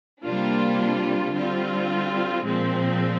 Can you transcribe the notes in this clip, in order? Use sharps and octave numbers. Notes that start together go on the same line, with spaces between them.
C3 G3 A#3 D4 F4
D3 G3 C4 F4
A#2 F3 G#3 C4